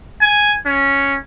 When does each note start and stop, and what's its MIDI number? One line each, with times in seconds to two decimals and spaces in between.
0.21 0.54 80
0.66 1.18 61